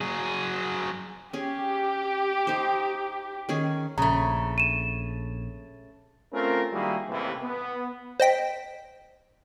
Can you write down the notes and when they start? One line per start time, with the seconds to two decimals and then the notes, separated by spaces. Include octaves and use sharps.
0.01 F#3 G#4
1.33 C#4 G4 G#4
2.47 D#4 C5
3.49 D#3 C#4 G#4
3.98 A#1 C#3 A3 A#5
4.58 D#7 E7
6.33 A3 C4 C#4 F4 A#4
6.72 D#3 F#3 G3 A#3 E4 G#4
7.09 A1 D#2 C3 E3
7.43 B3
8.20 C5 D#5 G5 B6